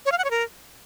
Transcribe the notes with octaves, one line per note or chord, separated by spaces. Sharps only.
C#5
F5
F#5
C#5
A#4